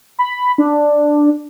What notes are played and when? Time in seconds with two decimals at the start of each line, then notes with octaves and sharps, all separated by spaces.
0.19 B5
0.58 D4